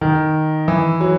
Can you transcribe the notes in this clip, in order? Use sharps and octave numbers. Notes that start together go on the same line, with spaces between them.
D#3
E3
F#3